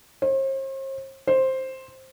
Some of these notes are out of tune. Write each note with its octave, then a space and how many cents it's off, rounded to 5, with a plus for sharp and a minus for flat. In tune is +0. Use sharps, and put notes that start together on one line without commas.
C5 +45
C5 +5